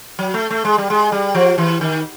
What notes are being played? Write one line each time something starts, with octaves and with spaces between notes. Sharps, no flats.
F#3
A3
A3
G#3
G3
G#3
G3
F3
E3
D#3